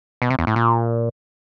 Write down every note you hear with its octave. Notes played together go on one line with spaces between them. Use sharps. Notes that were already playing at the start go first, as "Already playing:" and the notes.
B2
C3
E2
A2
A#2